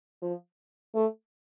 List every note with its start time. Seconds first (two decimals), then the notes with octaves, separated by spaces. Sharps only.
0.22 F3
0.95 A3